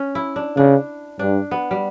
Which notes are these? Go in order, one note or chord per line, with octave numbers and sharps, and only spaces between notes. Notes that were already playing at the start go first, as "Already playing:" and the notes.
Already playing: C#4
E4
D4
C#3 D4
G2 D4
B3
G3